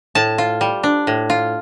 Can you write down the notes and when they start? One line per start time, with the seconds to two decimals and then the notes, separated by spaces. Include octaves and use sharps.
0.15 A2 A5
0.38 F4
0.61 G3
0.83 D4
1.07 A2
1.30 F4